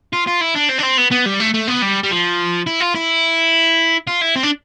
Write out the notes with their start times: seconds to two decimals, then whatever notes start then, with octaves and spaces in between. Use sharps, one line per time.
0.13 F4
0.27 F4
0.41 E4
0.55 D4
0.69 C4
0.79 D4
0.83 C4
0.98 B3
1.11 B3
1.26 G3
1.40 A3
1.54 A3
1.68 B3
1.82 G3
2.03 G3
2.11 F3
2.67 E4
2.81 F4
2.95 E4
4.07 F4
4.21 E4
4.36 C4
4.43 D4